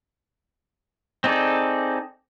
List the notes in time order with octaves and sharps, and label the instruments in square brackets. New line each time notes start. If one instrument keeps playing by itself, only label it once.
[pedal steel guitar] C4 D#4 G#4 A4 D5